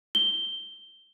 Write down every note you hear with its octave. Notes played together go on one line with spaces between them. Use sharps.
G7